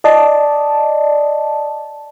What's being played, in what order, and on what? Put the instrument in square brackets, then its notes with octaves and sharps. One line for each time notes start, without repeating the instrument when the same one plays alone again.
[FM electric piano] D5 D#5 A5